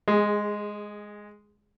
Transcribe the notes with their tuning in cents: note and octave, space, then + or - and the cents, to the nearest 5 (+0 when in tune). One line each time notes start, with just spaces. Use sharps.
G#3 +0 G#4 -25